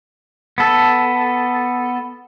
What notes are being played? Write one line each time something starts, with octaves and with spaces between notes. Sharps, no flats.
B3 A4